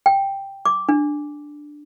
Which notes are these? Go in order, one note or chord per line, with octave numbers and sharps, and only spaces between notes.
G5
D6
D4